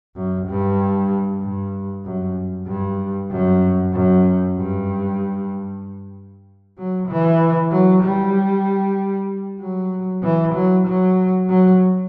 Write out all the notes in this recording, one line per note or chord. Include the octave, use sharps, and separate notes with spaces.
F#2
G2
G2
F#2
G2
F#2
F#2
G2
F#3
E3
F#3
G3
F#3
E3
F#3
F#3
F#3